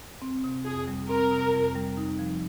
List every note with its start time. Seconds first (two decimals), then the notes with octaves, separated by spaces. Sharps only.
0.22 C4
0.44 C3
0.65 F2 G#4
0.88 G3
1.09 C4 A#4
1.31 C3
1.54 F2
1.76 G3
1.97 D#4
2.19 F3